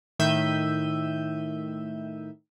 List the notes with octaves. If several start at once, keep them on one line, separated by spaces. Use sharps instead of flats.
A2 D#3 E5 G6 D#7